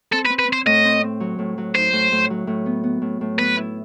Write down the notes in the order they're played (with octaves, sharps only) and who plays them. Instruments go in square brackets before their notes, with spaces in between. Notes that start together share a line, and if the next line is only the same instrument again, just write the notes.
[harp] C4 [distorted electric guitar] A4
[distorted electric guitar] B4
[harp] C4
[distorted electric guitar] B4
[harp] C4 [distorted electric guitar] C5
[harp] A2 [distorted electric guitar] D#5
[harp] C4
C4
F#3
A2
F#3
[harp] D#4 [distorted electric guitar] C5
[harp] A2
A2
F#3
A2
B3
B3
A2
A2
[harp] B3 [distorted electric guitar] B4
[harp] E4